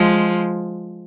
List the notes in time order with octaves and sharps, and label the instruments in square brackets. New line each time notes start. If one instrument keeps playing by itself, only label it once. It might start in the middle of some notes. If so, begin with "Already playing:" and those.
Already playing: [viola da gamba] F3 G#3